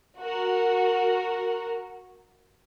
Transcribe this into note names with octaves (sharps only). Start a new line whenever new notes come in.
F#4 A#4